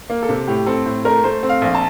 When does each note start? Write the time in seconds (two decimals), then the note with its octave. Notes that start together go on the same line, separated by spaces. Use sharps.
0.10 A#3
0.23 A4
0.29 C3
0.48 A2 G4
0.66 C4 A4
0.86 A2
1.05 A3 A#4
1.24 A3 C5
1.43 C4
1.49 F5
1.62 A#1
1.75 A5